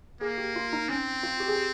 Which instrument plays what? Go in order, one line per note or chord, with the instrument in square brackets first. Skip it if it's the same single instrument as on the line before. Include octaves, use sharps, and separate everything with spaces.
[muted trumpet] A#3 [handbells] G#4
[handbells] G4
F4
D#4
[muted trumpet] C4 [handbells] C#4
[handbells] F4
G4
G#4
G4